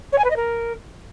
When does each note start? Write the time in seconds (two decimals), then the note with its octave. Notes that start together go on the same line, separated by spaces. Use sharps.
0.12 C#5
0.18 G#5
0.24 B4
0.30 D#5
0.36 A#4